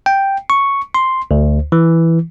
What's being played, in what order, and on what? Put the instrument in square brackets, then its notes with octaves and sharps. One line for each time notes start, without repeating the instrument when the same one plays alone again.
[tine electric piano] G5
C#6
C6
D2
E3